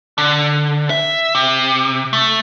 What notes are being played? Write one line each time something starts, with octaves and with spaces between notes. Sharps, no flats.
D3
E5
C3
A3